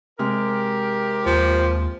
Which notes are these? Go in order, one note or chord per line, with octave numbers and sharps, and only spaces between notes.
C3 G#3 G4 A#4 F6
D#2 F3